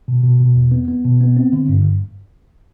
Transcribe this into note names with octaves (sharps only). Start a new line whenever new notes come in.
B2
B2
B2
E2
B3
B3
B2
B3
C4
D3
G2
G2